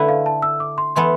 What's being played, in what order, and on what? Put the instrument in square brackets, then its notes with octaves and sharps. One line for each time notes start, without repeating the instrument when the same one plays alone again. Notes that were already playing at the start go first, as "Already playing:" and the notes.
Already playing: [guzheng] D3 A3 E4 B4
[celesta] F5
A5
E6
D6
C6
[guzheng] E3 B3 E4 A4 [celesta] C6